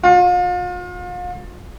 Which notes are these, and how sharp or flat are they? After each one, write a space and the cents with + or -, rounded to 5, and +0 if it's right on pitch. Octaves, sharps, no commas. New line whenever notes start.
F4 +40